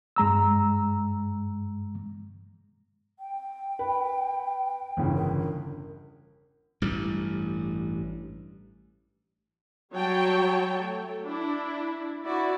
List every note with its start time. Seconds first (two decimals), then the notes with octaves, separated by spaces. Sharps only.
0.16 G2 G#3 A#5 E6
3.19 G5
3.79 B4
4.97 G1 E2 C#3
5.15 A#4
6.82 A1 G2 G3
9.93 F#3 G3 C#5 G5 A5
10.76 A3
11.26 D4 E4
12.24 E4 F#4 D5